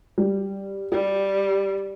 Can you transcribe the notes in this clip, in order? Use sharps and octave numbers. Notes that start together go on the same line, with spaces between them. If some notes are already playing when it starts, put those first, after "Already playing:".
G3
G3 G4